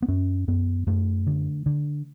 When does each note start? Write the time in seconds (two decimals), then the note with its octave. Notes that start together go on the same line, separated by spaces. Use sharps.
0.02 B3
0.08 F#2 C#4
0.48 F#2 B3
0.87 F#2 A3
1.27 D3
1.66 D3